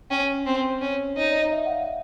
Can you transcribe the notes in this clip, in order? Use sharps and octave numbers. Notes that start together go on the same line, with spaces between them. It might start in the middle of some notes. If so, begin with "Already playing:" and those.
C#4 G5
C4
C#4 C#5
D#4 C#5
D5
D#5
E5
F#5
F5